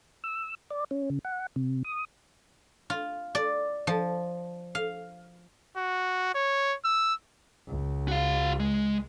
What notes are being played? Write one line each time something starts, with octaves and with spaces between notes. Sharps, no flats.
E6
D5
C#4
C#3
F#5
C3
D#6
F4
D5
F3
F5
F#4
C#5
E6
C#2
F#4 F5
G#3